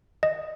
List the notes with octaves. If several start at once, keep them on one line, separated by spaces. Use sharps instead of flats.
D#5